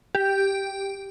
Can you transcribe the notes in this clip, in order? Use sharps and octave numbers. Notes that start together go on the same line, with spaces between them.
G4